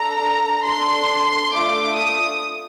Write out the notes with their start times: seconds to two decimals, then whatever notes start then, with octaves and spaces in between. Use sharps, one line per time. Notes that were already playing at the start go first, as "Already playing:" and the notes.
Already playing: D4 A4 A#5
0.64 D4 A4 C6
1.51 A3 D4 F4 D6
1.95 D#6